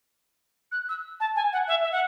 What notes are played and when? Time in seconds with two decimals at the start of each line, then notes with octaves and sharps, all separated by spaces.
0.72 F#6
0.89 E6
1.20 A5
1.36 G#5
1.53 F#5
1.68 E5
1.83 E5
1.92 F#5